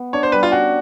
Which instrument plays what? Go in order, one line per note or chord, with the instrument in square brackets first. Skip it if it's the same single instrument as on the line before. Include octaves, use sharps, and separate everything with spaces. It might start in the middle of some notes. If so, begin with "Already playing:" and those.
Already playing: [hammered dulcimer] B3
[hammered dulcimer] D4 [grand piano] C#5
[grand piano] C5
[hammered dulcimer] G3 [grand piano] B4
[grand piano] F4
[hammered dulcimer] C#4 [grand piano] F#4